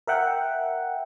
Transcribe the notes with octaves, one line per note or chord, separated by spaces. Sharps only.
A#4 E5 F#5 G5